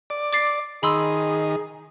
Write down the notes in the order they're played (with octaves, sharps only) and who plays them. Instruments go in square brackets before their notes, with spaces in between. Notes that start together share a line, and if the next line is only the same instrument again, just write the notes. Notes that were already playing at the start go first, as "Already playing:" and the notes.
[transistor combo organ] D5
[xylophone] D6 A6 C7
[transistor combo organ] D#3 [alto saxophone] G#4 [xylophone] B5 C6 E6